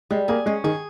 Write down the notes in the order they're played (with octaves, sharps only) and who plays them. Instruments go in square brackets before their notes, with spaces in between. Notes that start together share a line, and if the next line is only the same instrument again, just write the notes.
[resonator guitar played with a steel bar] G3 [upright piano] G#3
[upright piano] A#3 [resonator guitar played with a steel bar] G#4
[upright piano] G#3 [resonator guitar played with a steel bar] C#4
[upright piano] D#3 [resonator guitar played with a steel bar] G#4